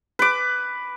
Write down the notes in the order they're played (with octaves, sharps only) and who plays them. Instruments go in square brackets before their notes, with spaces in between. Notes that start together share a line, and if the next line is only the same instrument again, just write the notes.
[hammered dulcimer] B4 D6